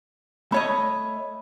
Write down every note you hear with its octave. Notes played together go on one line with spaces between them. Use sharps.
A3 C#5 D#5 B5